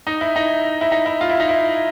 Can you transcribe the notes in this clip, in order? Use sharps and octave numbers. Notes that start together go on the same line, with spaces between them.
D#4
E4
D#4
E4
D#4
E4
F4
E4
D#4
E4